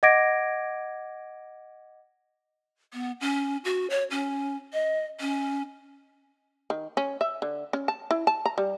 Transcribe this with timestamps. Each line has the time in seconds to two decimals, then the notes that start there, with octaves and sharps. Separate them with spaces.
0.03 D#5 F#5 D6 G#6 A#6 D7
2.94 B3
3.21 C#4
3.65 F#4
3.90 C#5
4.11 C#4
4.73 D#5
5.20 C#4
6.70 D#3
6.97 C#4
7.21 E5
7.42 D3
7.73 C#4
7.88 A5
8.11 E4
8.27 A5
8.46 A#5
8.58 G3